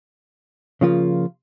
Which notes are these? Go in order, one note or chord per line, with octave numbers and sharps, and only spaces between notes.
C#3 F3 A#3 F4